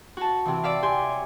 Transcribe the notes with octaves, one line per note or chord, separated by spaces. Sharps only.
F#4 A5
C3 E3
D5 E5 F5
G4 E5 G#5 C6
C#5